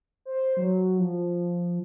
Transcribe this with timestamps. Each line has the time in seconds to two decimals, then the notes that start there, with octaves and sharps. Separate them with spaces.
0.25 C5
0.57 F#3
0.99 F3